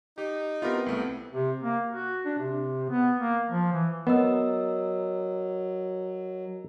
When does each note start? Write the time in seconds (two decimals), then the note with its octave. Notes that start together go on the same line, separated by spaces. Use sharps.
0.18 D#4 G4
0.62 B3 C4 E4 F4 G4 A#4
0.86 C2 A3
1.32 C3
1.62 A#3
1.90 F#4
2.25 D4
2.39 C3
2.90 B3
3.17 A#3
3.50 F3
3.73 E3
4.07 F#3 B3 A#4 D#5 E6